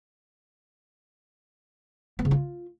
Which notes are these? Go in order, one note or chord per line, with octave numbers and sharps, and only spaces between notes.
B3
C#3
F4